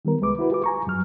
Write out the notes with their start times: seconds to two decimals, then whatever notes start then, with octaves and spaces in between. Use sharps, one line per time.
0.05 D#3 G3 B3 A#4
0.21 C2 G#3 B4 D6
0.39 E4 F#4 B4
0.50 F4 G4 G#4 B4 D6
0.64 G#5 A#5 C#6
0.87 F#2 F#3 F6